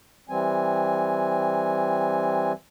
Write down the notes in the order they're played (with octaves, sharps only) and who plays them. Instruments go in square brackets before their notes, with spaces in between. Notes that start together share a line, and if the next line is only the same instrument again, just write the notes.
[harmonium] E3 G3 C4 G#5